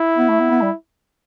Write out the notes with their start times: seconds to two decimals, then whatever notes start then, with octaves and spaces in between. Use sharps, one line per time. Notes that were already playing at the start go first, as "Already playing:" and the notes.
Already playing: E4
0.18 B3
0.29 A3
0.40 B3
0.51 B3
0.62 G3